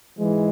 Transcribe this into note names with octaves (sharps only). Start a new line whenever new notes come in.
G#2 E3 G#3